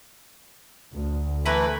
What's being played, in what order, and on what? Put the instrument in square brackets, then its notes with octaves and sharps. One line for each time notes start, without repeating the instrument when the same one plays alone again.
[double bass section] D2
[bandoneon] E3 A3 E4 [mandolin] A#4 B4 B5